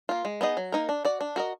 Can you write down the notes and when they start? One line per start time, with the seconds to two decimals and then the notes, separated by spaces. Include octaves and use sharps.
0.09 A#3 F4
0.25 G#3
0.41 B3 D#4 G#4 D#5
0.57 F#3
0.72 A#3 D#4 A#4
0.89 D4
1.05 F#4 D5
1.21 D4
1.36 F#4 A#4 D#5